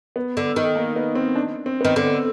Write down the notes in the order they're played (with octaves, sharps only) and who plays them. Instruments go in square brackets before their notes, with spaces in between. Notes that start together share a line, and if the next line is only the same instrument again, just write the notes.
[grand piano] B3
[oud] D3
D#3
[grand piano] A#3
B3
C4
D4
C4
[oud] D#3 [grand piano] B3
[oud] D3